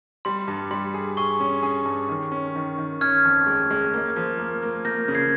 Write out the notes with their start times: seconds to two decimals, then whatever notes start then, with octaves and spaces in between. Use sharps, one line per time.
0.25 G3 C6
0.48 G2
0.71 G3 C6
0.94 G#4
1.17 G#4 C#6
1.40 C#4
1.63 G#4
1.85 G2
2.09 D#3
2.32 C#4
2.56 D#3
2.78 D#3
3.01 C#4 F6 G#6
3.24 F2
3.47 G#3
3.70 G#3
3.94 A#3
4.16 F3
4.38 A#3
4.62 A#3
4.85 A#3 G6 A#6
5.08 C#3
5.15 G#6 C7